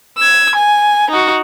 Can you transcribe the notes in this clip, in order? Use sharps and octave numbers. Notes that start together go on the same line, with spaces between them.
E6 G#6
G#5
D#4 F#4